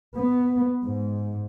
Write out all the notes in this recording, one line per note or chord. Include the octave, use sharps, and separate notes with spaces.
B3
G#2